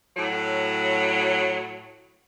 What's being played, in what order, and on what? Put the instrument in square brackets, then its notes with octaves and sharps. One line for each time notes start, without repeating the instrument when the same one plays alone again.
[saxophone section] A2 F#3